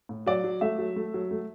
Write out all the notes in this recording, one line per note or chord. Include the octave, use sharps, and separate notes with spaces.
A2
F#3 D5
F#3
A3 E5
F#3
A3
F#3
A3